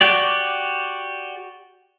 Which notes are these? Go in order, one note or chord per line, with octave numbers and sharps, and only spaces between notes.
F#4 G4 D5